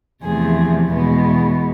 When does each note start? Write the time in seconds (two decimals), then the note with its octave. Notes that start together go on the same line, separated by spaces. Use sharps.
0.23 E2 C3 F3 A3 G#4
0.93 E2 B2 G#3 B3